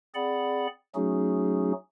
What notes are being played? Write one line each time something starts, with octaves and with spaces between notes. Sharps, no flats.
C4 G#4 D5 F#5 B5
F#3 A3 C#4 D#4 F#4 G#4